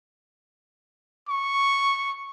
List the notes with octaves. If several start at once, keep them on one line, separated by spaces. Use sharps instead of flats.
C#6